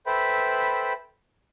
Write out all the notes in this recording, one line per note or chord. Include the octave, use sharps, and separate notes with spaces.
A4 B4 C5 E5 G5 B5